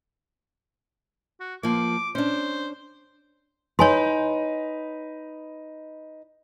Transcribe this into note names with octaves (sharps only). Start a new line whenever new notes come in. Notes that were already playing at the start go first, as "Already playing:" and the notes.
F#4
F3 A#3 D6
C#4 D4 C5
D#4 B4 C#5 G#5 C6